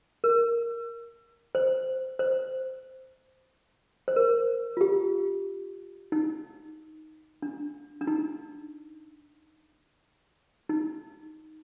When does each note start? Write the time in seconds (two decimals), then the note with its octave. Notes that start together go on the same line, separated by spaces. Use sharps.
0.24 A#4
1.55 C5
2.19 C5
4.08 C5
4.16 A#4
4.77 F4
4.81 G4
6.12 D#4
7.42 D4
8.01 D4
8.07 D#4
10.69 D#4